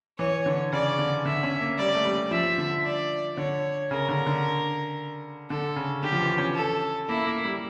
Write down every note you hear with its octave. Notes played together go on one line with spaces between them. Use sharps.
E3 C#5
D3
C#3 D5
D3
D3 E5
C#4
A#3
G3 D5
A3
G3
F3 E5
D3
D5
D3 C#5
C#3 A#4
D3
D3
D3 A4
C#3
D3 G4
F3
E3
C#4
A4
A#3 E4
A#3
G3